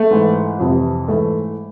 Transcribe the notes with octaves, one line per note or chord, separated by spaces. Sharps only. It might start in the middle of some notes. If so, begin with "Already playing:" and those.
Already playing: A3
G#2 E3
F2 C3 E3
G#2 E3 A3